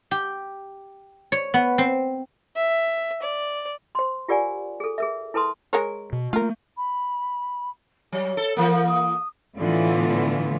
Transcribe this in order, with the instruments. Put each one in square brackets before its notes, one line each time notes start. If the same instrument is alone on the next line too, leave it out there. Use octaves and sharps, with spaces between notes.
[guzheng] G4
C#5
B3
C4
[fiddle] E5
D5
[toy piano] C5 C6
F4 G4 A#4 D5 F#5 G#5
G#4 A4
G#4 A#4 E5
E4 A4 B4 A5 C6 D#6
[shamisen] G#3 A#4 C#5
[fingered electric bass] B2
[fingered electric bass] A3 A#3 [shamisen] F4 A#4
[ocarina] B5
[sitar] F#3 [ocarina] C#5
[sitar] A4
[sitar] E3 A#3 [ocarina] A#4
[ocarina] D#6
[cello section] A2 D3 E3 B3 F4